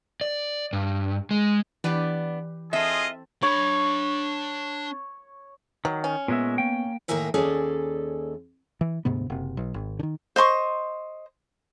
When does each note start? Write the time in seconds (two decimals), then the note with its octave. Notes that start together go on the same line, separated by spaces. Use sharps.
0.21 D5
0.73 G2
1.31 G#3
1.84 E3 B3 D4 G4 B4 D5
2.73 C4 F4 G#4 A4 D#5 E5
3.43 D4 C#5 B5
5.85 D#3 F#3
6.04 C#4
6.28 A#2 G#3 B3 E5
6.58 A#3 G5
7.08 A2 D#3 A#3 A#4 E5 G#5
7.34 D#2 C#4 G#4 A4 D5
8.81 E3
9.05 D2 G#2 C3 B3
9.30 F#1 C3
9.57 B1
9.74 G#1
9.99 D3 D#3
10.36 C5 D#5 C6 C#6